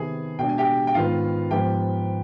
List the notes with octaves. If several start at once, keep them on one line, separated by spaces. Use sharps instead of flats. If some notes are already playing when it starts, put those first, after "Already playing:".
Already playing: C3 D#3 B3 G#4 G#5
B2 G#3 D4 G5
G#5
G4 G5
G5
G#2 D#3 B3 F4 F5
G#2 F3 B3 G4 G5